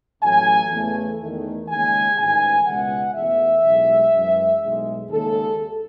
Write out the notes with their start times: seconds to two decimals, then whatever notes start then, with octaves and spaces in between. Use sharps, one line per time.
0.22 A1 A2 F#3 A3 G#5
0.71 E2 C#3 E3 A3
1.19 E2 D#3 A3
1.68 D#2 C#3 G#3 G#5
2.17 A1 G#2 D#3 G#5
2.65 C#2 B2 G#3 F#5
3.15 E2 B2 A3 E5
3.63 B1 A2 G#3
4.12 F#2 E3 G#3
4.61 B1 A2 G#3
5.09 D#2 C#3 G#3 A4